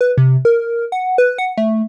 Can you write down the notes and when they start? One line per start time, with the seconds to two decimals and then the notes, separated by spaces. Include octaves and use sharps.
0.01 B4
0.18 C3
0.45 A#4
0.92 F#5
1.18 B4
1.38 F#5
1.57 A3